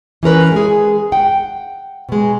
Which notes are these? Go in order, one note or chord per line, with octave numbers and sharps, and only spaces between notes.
E3 C#4 A#4 B4
G#3 G#4
F#5 G5
B2 G#3